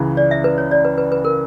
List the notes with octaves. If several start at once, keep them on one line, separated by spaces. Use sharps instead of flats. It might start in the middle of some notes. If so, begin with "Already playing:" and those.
Already playing: C#2 C#3 E3
D5
E5
B4
C#5
D5
B4
B4
B4
A#4